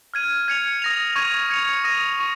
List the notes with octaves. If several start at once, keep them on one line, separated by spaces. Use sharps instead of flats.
F6 G#6 D#7
G#6 C#7 F7
D#6 A#6 F7
C#6 G#6 D#7
G#6 C#7 F7
D#6 A#6 D#7
C#6